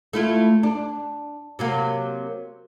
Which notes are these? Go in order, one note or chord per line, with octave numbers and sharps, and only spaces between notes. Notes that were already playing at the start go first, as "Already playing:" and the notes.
A3 E4 F4
D4
C3 F#3 A#3